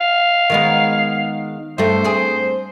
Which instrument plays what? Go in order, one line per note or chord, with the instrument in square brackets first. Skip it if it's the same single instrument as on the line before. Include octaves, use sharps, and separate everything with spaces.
[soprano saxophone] F5
[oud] D#3 G#3 B3
[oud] G2 A3 [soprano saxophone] C5
[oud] C4 G#4